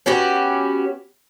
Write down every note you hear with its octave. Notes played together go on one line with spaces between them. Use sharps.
B3 C#4 F#4 G4